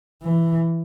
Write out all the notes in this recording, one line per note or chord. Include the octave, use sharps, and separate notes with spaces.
E3